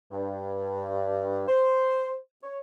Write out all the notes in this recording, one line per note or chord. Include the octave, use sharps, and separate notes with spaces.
G2
C5
C#5